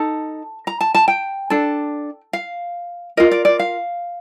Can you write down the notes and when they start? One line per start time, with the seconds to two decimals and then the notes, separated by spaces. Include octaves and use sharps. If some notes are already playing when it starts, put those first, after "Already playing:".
Already playing: D#4 A4 A5
0.67 A#5
0.81 A5
0.95 A5
1.08 G5
1.50 D4 A4
2.33 F5
3.17 F4 A#4 D#5
3.31 D5
3.45 D5
3.60 F5